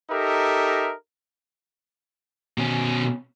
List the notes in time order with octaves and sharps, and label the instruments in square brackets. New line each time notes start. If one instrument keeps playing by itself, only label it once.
[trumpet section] D#4 G4 A4 A#4 E5
[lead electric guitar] B2 C#4